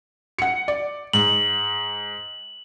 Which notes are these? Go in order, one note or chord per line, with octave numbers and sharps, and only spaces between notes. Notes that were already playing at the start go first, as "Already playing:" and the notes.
F#5 C#7
D5
G#2 F#7